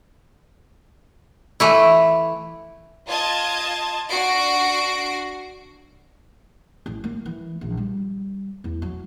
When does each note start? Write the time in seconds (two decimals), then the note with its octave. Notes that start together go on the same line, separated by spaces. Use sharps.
1.60 E3 A3 E4
3.08 F4 D#5 A5 G#6
4.09 D4 F#4 A#6 C7 D7
6.86 A1
7.04 A#3
7.26 E3
7.61 A#1
7.77 G3
8.64 E2
8.82 F#3